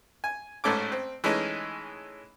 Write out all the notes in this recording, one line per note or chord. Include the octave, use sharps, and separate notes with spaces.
G#5
A1 G#2 A3 C#4 A4 D6
C4
E3 G#3 A3 C#4 D#4